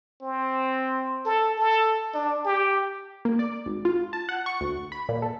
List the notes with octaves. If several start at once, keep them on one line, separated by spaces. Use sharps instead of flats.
C4
A4
A4
D4
G4
A#3
D5
G#1
F4
A5
F#5
C#6
D2
B5
A#2
A4